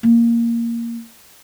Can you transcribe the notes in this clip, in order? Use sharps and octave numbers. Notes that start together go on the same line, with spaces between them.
A#3